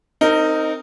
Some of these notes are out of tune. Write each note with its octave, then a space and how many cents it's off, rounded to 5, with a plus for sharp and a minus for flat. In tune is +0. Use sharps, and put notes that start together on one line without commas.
C4 +0 D#4 +0 A#4 -25